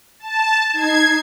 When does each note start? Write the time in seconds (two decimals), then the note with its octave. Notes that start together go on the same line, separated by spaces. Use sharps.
0.20 A5
0.73 D#4 G#6 C7